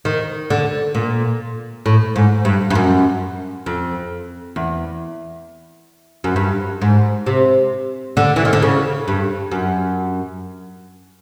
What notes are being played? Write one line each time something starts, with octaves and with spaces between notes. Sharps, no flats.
D#3
D3
A#2
A2
G#2
G2
G2
F#2
F2
E2
F#2
G2
G#2
C3
D3
E3
D#3
D3
C#3
G2
F#2